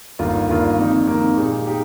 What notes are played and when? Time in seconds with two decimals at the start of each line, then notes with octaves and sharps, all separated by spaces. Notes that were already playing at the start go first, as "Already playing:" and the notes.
0.19 G1 G2 D#3 A#3 F4
0.48 G1 G2 D#3 A#3 F4
0.78 F2 D#3 A#3 D#4
1.07 F2 D#3 A#3 D#4
1.36 A#2 G#3 D#4 G4
1.66 G#3 D#4 G4